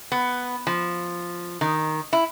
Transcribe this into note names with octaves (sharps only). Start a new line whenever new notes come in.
B3
F3
D#3
E4